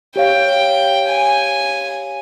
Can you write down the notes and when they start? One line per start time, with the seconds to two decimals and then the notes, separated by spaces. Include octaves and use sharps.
0.16 G4 C#5 F5 G5
1.09 G#5